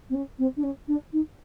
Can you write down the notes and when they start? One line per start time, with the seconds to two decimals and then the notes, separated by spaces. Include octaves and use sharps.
0.10 C4
0.14 C#4
0.38 C4
0.56 D4
0.63 C#4
0.88 D4
1.13 D#4